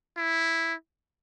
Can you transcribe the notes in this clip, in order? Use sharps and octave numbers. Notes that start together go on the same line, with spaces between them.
E4